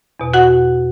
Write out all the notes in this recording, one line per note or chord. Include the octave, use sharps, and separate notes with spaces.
E2 B2
F#4 F#5